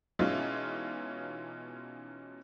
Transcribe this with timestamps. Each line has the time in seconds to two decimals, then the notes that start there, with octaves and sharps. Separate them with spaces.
0.19 B2 E3 G#3 C#4 D#4 F4